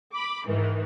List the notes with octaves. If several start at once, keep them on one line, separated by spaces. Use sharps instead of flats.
B5 D6
G#2 D#3 E3